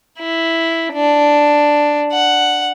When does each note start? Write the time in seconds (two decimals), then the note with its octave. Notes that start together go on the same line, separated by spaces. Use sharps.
0.20 E4
0.94 D4
2.13 F#5